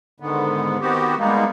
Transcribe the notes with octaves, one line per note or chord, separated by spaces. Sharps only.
G#2 D3 D#3 B3
D#3 B3 C4 F#4 G4
G3 G#3 A#3 B3 D#4